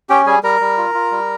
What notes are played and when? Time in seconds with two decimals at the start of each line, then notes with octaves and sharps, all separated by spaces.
0.09 C#4 G4 G5
0.26 G3 G#4 G#5
0.43 G3 A#4 A#5
0.61 G3
0.78 F4
0.94 F4
1.11 G3